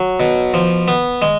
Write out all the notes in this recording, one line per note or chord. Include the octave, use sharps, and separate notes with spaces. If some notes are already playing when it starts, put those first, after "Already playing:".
Already playing: F#3
B2
F3
B3
G#3